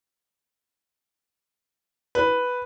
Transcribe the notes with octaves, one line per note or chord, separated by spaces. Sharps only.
B4